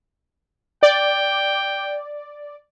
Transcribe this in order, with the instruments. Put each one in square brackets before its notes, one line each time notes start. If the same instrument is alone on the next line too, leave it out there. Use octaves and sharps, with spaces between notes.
[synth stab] D5 [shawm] G5